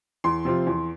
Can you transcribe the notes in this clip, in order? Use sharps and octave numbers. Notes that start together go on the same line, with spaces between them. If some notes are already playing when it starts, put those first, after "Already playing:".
E2 C6
C3 F3 C4 F4
E2